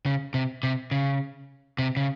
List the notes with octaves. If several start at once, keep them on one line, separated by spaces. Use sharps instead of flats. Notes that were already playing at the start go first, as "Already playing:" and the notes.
C#3
C3
C3
C#3
C3
C#3